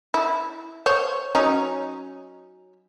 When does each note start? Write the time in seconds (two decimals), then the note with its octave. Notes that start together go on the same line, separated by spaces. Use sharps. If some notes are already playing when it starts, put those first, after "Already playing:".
0.14 E4
0.86 C5 C#5
1.35 F#3 C#4 D#4